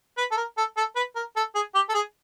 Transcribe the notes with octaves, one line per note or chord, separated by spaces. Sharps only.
B4
A4
A#4
A4
A4
B4
A#4
A4
G#4
G4
A4
G#4